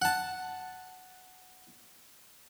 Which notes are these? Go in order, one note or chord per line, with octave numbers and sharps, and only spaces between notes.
F#5 A5